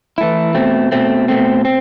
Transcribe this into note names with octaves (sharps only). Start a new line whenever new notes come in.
E3 A3 E4
B2 A3 C4
B2 A3 C4
B2 A3 C4
C4